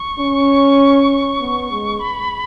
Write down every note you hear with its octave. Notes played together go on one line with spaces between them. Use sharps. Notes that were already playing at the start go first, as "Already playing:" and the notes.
Already playing: C#6
C#4
B3
G#3
B5